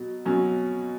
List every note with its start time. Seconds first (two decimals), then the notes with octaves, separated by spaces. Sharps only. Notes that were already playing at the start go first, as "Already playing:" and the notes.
Already playing: B2 F#3
0.25 B2 F#3 C#4